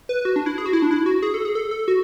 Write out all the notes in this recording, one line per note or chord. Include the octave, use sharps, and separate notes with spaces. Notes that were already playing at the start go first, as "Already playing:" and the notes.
B4
F#4
D4
E4
G#4
F#4
E4
D4
E4
F#4
G#4
A4
G#4
A4
A4
F#4